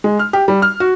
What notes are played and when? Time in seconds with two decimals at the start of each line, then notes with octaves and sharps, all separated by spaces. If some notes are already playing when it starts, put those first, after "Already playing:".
0.04 G#3
0.19 F6
0.33 G4
0.48 G3
0.62 F6
0.80 F#4